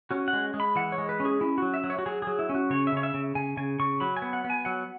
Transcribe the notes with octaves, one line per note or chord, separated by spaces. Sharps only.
C#4 F#4
F#5
G#3
G#3
B5
E3 F#5
C#5
G#3
B4
C#4
G#4
C#4 E4
F#3 F#4
E5
F#3
C#5
F#4
F#3 G#4
F#3 G#4
E4
C#4
F#4
C#3 C#5
E5
C#3 C#5
E5
C#3
C#3 G#5
C#3 G#5
C#3 C#6
F#3 B5
G#5
B3
F#5
B3
G#5
F#3 F#5